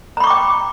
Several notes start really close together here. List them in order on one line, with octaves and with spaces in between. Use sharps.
A#5 B5 C#6 D6 G5